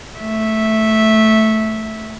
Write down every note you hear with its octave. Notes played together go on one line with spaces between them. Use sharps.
A3 E5